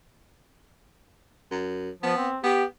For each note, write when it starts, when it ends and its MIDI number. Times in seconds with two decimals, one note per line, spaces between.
1.51 1.90 42
2.03 2.16 53
2.03 2.28 59
2.17 2.38 60
2.43 2.64 59
2.43 2.64 67